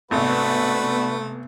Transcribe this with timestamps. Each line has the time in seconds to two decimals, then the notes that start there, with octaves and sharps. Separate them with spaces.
0.11 G#1 C3 A3 B3 D4 F#4 B4